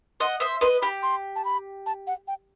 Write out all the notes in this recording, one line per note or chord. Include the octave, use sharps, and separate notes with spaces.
D#5 F#5 C6
C5 E5 D#6
B4 D#5 C6
G4 B5
C6
A5
B5
A5
F#5
G5